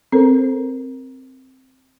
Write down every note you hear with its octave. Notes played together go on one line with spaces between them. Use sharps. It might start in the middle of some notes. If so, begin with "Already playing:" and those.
C4 A4 A#4 C5